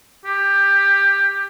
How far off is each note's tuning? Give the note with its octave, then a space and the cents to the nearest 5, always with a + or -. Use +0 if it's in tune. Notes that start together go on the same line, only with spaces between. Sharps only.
G4 +15